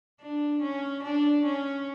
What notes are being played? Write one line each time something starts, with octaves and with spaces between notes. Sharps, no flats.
D4
C#4
D4
C#4